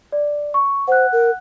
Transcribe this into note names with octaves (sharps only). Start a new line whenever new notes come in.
D5
C#6
C5 F#5 F#6
A#4